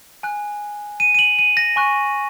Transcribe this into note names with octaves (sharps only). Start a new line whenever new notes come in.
G#5 F#6
D#7
D#7
F#7
D#7
A#6
G#5 C#6 F#6